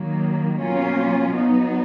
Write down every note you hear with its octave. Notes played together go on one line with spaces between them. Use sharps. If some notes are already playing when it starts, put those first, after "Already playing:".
Already playing: D#3 F#3 A#3
B2 F#3 A#3 C#4 F4
F#3 B3 D#4